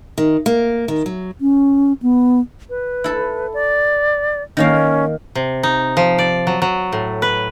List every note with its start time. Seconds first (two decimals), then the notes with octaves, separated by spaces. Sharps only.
0.18 D#3
0.46 A#3
0.88 D#3
1.06 F#3
1.39 C#4
2.02 B3
2.70 B4
3.04 E4 A4
3.54 D5
4.57 D#3 A#3 C#4 F5
5.35 C3
5.63 D#4
5.97 F3
6.19 D5
6.47 F#3
6.62 F#3
6.92 A2
7.22 B4